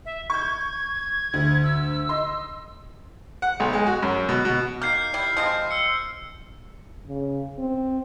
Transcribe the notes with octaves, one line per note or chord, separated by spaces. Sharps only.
E5
C#6 G6 G#6
D2
E6
D#5 C6
F#5
B1
G#3
F#4
F#2
B2
B2
D#3 A#3 F6 G6 C7
G3 E4
F3 G#3 C4 G6
E6 C#7
C#3
C4